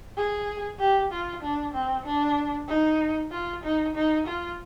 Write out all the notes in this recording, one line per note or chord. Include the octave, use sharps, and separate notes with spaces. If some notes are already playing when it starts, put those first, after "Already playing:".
G#4
G4
F4
D4
C4
D4
D#4
F4
D#4
D#4
F4